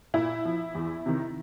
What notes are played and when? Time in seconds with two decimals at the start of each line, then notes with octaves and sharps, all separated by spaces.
0.14 A#2 E4
0.45 F3
0.75 E2
1.06 C3 D#3